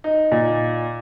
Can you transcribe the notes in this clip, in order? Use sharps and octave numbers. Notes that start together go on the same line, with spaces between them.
D#4
A#2